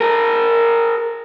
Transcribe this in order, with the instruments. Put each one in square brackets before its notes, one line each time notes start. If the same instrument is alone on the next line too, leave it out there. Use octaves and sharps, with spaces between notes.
[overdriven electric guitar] G#4 A#4